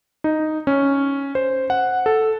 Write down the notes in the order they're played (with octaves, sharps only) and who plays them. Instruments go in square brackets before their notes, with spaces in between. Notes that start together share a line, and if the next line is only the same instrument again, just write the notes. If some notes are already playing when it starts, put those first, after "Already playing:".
[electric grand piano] D#4
C#4
C5
F#5
A4